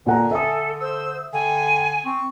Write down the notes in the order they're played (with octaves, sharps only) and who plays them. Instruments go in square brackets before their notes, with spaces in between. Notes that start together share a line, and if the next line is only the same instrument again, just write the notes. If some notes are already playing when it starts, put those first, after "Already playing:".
[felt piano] A#2 F#5 A#5 [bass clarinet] D3 [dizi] G#5
[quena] A4 [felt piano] E5 D#6
[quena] C5 [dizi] E6
[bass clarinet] D3 [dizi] G5 [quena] G#5
[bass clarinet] C4 [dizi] C#6